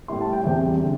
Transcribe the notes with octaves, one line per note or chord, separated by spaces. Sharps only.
A2 G3 E4 C6
A5
G5
E2 E3 G3 C4 E4 G5
D3